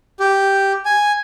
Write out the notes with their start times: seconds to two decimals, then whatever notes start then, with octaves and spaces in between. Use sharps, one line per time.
0.20 G4
0.85 G#5